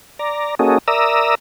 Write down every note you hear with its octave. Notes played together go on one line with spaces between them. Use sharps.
D5 A#5
A#3 C#4 F#4 G#4 A4 D#5
A#4 D5 E5 A#5 D#6 E6